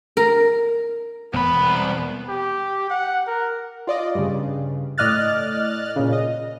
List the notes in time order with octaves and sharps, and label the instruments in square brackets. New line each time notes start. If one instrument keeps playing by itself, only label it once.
[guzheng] A#4
[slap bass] E1 [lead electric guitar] C2 B5 [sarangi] B3
[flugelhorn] G4
F#5
A#4
[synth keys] F4 D5 D#5
G2 C#3
A2 D5 D#5 F6 F#6 A6
A#2 C#3
D#5